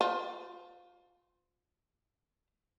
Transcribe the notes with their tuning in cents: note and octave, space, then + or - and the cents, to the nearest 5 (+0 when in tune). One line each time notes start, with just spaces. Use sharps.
F4 +25 C5 -35